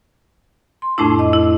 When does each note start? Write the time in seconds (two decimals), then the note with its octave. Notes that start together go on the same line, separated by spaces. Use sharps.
0.82 C6
0.98 F2 A2 A3 D4 E4
1.19 D#5
1.33 E4